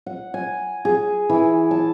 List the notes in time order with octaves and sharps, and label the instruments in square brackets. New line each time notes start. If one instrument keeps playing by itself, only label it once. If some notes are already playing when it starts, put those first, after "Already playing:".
[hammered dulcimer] F#5
G#5
G#4
E3
A5